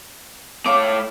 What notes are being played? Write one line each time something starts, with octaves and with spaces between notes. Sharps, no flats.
A3 C#5 F5 D6